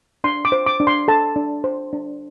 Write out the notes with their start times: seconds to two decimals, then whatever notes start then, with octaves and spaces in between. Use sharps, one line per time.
0.24 D4 C6
0.45 D6
0.52 C5
0.66 D6
0.80 D4
0.87 C6
1.08 A4 A5
1.36 D4
1.64 C5
1.93 D4